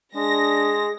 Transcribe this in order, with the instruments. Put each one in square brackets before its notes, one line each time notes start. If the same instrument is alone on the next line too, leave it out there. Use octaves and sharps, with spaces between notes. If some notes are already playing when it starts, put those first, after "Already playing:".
[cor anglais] G#3 [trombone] D4 [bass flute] G#4 [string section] A#6